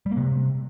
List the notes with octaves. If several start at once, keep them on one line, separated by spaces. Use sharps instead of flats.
G3
A#3
C3